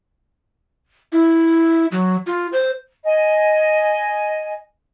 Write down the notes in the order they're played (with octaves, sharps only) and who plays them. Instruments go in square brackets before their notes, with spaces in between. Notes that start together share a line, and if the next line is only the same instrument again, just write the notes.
[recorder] E4
F#3
F4
C5
[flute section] D#5 G#5